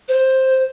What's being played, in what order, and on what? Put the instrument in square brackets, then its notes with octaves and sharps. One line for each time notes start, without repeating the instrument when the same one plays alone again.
[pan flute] C5